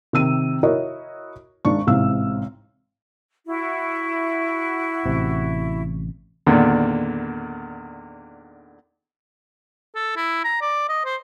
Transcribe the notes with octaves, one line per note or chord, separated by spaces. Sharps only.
C3 D#3 E6 D#7
E4 F#4 A#4 C#5 D#5
G#1 G#2 D4 C#6
A1 G#2 C3 F5 E6
E4 F#4
A1 C3
E2 A#2 D3 D#3
A4
E4
A#5
D5
D#5
C5